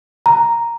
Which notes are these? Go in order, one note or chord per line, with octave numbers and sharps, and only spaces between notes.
A#5